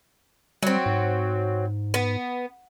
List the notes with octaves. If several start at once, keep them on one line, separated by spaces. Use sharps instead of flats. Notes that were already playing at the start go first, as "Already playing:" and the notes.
F#3 G3 C4
G#2
B3